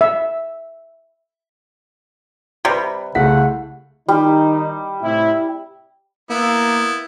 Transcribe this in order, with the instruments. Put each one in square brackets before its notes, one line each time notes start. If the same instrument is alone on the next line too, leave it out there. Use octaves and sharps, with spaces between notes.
[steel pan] E5
[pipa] C3 G3 [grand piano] B4 B5
[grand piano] C2 A3 B6 [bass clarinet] C#3 [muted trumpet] F#5
[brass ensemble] D#3 D#4 [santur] G3
[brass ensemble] A2 C3 E4
[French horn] A#3 [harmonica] B3 E4